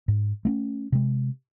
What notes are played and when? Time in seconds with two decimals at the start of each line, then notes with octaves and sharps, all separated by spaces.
0.08 G#2
0.45 A3 B3 C#4
0.92 C3 G#3